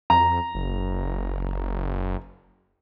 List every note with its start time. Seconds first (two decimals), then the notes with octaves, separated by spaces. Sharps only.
0.10 F2 A#5
0.55 F#1